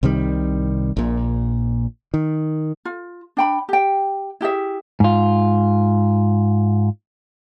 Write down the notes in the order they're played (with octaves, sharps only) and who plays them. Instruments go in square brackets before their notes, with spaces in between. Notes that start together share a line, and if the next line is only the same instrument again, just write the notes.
[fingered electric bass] C2 C3 D#3 G3
A#1 A#2
D#3
[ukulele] F4
D4 G5 B5
G4 G5
E4 G4 G#4 E5
[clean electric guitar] G#2 F4